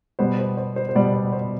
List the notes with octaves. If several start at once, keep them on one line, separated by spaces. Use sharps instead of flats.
B2 G3 B3 C5
C5
C5
C5
C5
B2 G3 B3 D5
D5
C5